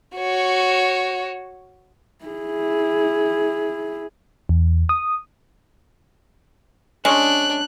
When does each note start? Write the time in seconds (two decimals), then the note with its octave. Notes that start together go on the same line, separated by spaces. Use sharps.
0.17 F#4 C#5
2.25 E4 G#4
4.49 E2
4.89 D#6
7.05 G#3 C#4 D4 C#5 F#6